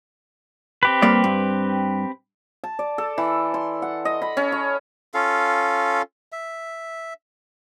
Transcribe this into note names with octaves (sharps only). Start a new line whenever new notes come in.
C4 G4 B4
G3 A#3 D5
G2
A5
D5
A4
E3
C6
F#5
D#5
B5
C#4
C#6
C#4 F4 A4 F5
E5